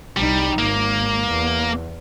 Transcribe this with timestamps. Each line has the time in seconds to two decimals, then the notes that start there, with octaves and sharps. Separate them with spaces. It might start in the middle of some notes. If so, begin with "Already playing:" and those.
0.17 C2 G3 D#4
0.58 G#1 A#3
1.28 E2